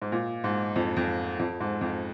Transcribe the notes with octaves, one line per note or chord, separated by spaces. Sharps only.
G#2
A#2
G#2
F2
F2
F2
G#2
F2